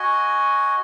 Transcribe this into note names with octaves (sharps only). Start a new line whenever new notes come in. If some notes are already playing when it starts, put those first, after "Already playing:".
Already playing: F#4 D#5 G#5